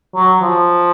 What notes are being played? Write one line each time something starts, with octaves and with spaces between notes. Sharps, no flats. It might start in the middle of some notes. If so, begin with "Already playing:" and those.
F#3
F3